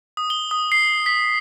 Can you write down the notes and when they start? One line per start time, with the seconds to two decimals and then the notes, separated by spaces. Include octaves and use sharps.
0.17 D#6
0.30 G7
0.51 D#6
0.72 C7
1.06 B6